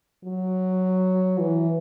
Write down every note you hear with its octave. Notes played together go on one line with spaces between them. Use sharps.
F#3
E3